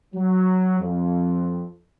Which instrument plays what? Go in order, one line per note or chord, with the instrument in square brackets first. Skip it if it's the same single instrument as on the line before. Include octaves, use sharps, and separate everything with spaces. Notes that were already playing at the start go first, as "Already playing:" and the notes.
[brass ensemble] F#3
F2